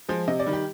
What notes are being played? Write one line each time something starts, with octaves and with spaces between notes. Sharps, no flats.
F3 G#3
C3 D#5
D5
D#3 G3
G4